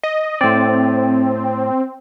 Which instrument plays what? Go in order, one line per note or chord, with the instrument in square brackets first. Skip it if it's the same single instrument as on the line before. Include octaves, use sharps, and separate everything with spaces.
[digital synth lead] D#5
[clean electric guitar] A2 D5 [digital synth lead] C4